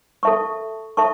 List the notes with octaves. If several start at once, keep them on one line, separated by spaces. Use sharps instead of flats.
A4 E5 A5 C#6
A4 E5 A5 C#6